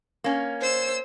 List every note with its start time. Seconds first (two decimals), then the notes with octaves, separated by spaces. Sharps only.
0.24 A#3 C#4
0.60 C5 E6